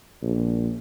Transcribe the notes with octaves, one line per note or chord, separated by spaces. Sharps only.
A#1